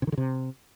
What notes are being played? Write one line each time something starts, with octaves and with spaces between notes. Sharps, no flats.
C3
D#3
D3
C3